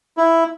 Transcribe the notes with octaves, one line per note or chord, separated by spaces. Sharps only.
E4